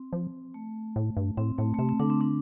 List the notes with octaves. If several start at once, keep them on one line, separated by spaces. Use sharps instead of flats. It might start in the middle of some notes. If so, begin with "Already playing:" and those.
Already playing: C4
F3
A3
A2
G2
A2 C4
A2 A3
A3
C3 C4
C4
D3 D4
C4
D4